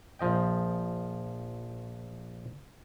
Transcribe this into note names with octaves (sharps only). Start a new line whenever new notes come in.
A#1 F3 D#5 G5